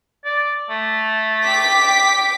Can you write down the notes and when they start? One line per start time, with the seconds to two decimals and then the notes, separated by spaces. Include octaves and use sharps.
0.25 D5
0.70 A3
1.44 G5 D6 B6